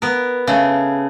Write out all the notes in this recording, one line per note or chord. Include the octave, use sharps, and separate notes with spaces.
B3 A#4
C#3 A3